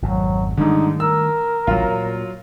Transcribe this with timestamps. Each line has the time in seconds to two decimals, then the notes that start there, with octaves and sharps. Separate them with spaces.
0.02 G#1 F2 B2 F#3
0.57 G#2 D3 D#3 G3 A3 D#4
1.00 A#4 E6
1.67 A1 D2 A#2 F#3 F4
1.88 A#2